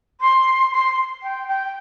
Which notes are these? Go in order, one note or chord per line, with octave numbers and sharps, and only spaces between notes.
C6
C6
G5
G5